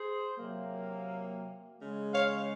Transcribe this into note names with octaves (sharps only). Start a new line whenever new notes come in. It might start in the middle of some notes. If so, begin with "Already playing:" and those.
Already playing: G#4 C5
C3 F#3 A#3
C#3 G#3
C#5 F5